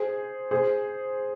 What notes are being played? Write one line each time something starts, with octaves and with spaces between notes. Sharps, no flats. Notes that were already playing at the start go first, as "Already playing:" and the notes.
Already playing: G#4 C5
G#4 C5